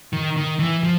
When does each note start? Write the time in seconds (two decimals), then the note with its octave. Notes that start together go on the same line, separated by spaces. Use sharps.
0.13 D#3
0.37 D#3
0.59 E3
0.83 F3